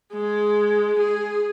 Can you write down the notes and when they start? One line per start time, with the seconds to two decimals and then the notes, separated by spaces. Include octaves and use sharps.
0.13 G#3
0.99 G#4